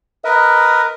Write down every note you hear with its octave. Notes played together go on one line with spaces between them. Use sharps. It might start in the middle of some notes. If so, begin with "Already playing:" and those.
A#4 B4 D#5